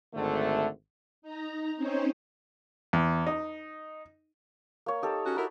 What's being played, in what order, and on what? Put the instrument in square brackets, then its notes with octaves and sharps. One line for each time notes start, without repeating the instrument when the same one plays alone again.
[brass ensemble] G#1 D3 A3
[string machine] D#4 A#5
C4 C#4 D#4 C5 C#5
[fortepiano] E2
D#4
[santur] A#3 C#5
D#4 G4 A4
[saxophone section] C#4 F#4
[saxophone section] E4 F#4 A#4 [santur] B5